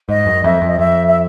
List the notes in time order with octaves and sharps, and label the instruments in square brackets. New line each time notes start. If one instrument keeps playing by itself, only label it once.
[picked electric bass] G#2 [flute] D#5
[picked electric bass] F#2
[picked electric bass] F2 [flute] E5
[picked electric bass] F2
[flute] D#5
[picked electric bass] F2 [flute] E5
[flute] E5